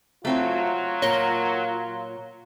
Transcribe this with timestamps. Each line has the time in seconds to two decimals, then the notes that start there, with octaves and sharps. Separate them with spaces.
0.25 F#3 A3 C4 E4 F4
1.02 A#2 A#4 C#5 A#6 G7